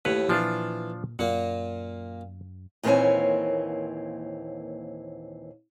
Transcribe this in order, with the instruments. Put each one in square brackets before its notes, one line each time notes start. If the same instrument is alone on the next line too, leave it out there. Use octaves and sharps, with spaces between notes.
[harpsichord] D#2 A2 [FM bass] A3 [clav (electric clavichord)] B4 C#5
[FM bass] A#2 [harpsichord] E3 [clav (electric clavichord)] F3 D4 F4
[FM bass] F#2 [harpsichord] A#2 A#3 [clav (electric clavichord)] F#5
[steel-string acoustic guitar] D#2 A#2 E3 C4 C#5 G#5